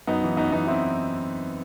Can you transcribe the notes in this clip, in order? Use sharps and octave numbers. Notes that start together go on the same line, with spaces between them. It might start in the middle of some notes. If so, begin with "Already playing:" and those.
F#2 B3 D#4
E3
F#2 B3 D#4
E3 B3 D#4
C4 E4